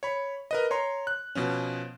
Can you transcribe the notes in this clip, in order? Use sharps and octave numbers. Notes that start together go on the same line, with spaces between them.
C#5 B5
A#4 B4 D#5
C#5 A#5 C6
F#6
B2 F3 C#4